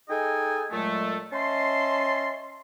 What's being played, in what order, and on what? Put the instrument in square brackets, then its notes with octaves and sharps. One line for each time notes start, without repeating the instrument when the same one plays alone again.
[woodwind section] D#4 G#4 A4 D#5 G5 G#5
A#2 F#3 G#3 A3
C#4 D#5 E5 A5 C6